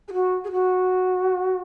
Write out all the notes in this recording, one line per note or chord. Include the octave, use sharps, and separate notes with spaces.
G#4
F#4
G#4
F#4